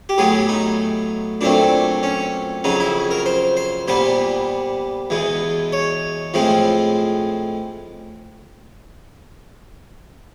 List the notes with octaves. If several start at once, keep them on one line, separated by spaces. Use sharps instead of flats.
G4
A2 F#3 B3 G#4
D#4
A#2 F#3 A3 C4 D4
C#4
F2 C#3 F#3 D#4
E4
A#4
C5
C5
A#2 G3 B3 C5
E2 B2 G#3
C#5
A2 F3 G#3 C4